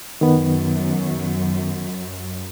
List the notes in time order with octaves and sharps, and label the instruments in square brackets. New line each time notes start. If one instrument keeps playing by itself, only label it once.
[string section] F#2 [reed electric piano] D#3 B3